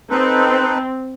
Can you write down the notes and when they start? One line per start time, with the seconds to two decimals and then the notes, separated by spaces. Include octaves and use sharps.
0.10 C4 D#4 A4 B4